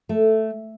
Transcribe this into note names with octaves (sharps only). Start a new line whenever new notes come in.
A3